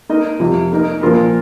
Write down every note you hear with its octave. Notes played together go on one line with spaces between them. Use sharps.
A#3 D#4 A#4 D#5
F2 C3 F3
A#3 D#4 A#4 D#5
A#2 F3 A#3 F4 A#4